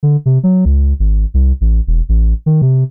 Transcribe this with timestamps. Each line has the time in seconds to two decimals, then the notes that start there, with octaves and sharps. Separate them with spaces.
0.03 D3
0.26 C3
0.43 F#3
0.65 C#2
1.00 G#1
1.34 C2
1.61 A1
1.87 E1
2.09 A1
2.46 D#3
2.62 C3